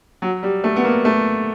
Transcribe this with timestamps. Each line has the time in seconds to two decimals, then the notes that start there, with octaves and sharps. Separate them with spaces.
0.22 F#3
0.43 G3
0.64 A3
0.76 B3
0.84 A#3
1.05 A3